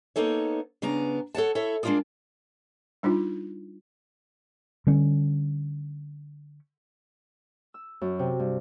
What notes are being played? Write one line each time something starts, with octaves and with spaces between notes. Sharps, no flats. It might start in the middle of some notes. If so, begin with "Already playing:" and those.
A#3 B3 D#4 A4 C#5
C#3 B3 D4 A#5
A4 C#5 F#5 A5
E4 A4 C#5 E5
G#3 D4 D#4 F4 A#4 D5
G3 D4 D#4 F4
D3 G3 C#4
E6
F#2
C3
G2